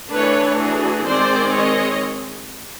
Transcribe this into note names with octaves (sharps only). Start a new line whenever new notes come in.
E3 A3 D4 B4 C#5
F#4 G#4
D#3 G#3 C4 C5 D5
C#5 D#5